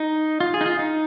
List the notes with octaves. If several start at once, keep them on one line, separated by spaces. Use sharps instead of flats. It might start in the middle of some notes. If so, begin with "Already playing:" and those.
Already playing: D#4
F4
G#4
D#4
F4
D#4